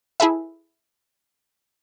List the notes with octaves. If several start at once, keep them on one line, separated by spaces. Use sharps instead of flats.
E4 G#4 A4 B4 E5